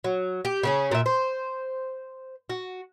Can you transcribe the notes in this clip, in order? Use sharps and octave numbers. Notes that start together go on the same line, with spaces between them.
F#3
G4
C#3 C#4 G#4
A#2 E5
C5
F#4